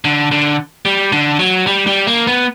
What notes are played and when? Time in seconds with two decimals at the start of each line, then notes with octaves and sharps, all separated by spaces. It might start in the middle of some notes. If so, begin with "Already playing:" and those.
0.05 D3
0.32 D3
0.85 G3
1.12 D3
1.39 F#3
1.67 G3
1.87 G3
2.07 A#3
2.27 B3